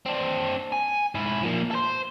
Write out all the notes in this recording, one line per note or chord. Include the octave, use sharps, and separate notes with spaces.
C4 D4
G#5
G#2 E4
F3 A#3
A4 C5